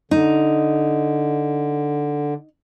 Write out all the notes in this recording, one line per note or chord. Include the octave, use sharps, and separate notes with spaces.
D3 D#4